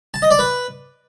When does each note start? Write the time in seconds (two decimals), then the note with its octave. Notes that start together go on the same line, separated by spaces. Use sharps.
0.14 A5
0.22 D#5
0.31 D5
0.39 B4